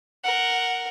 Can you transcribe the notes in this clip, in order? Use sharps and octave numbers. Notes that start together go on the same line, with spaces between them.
A#4 F#5